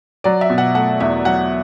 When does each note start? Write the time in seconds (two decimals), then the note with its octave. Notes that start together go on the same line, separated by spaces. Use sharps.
0.24 F#3 D5
0.41 E5
0.50 B2
0.58 F#5
0.74 A3 F#5
1.00 E2 E5
1.25 F#3 F#5